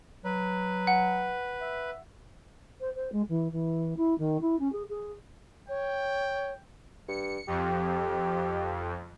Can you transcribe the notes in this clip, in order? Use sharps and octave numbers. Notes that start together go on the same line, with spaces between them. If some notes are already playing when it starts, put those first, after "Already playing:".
F#3 B4
F#5
E5
C5
C5
G#3
E3
E3
E4
D#3
E4
C#4
G#4
G#4
C#5 G5
G2 C#7
F2 G4